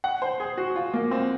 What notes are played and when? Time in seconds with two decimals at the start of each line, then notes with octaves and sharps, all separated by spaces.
0.04 F#5
0.22 C5
0.40 G#4
0.58 F#4
0.76 F4
0.94 A#3
1.11 C4